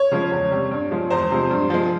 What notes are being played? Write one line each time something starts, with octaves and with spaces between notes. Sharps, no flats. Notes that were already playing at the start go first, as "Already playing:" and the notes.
Already playing: C#5
C#3 F3 G#3
E2
C3 G3
G2
F3 G#3
E2 C5
C3 F3 G#3
G2
F3 G#3